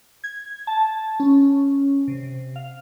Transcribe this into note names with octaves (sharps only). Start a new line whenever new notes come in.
G#6
A5
C#4
C3
F5